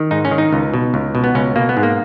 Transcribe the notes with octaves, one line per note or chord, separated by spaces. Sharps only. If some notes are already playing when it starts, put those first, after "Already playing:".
Already playing: D#3
G#2 D#4
C#4
D#3
D#4
C#2
B2
C#2
B2
B3
C#2 C#4
B2 A#3
B3
G#2
A#3